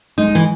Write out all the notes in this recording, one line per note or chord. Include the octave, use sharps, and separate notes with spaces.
G#3 D#4
E3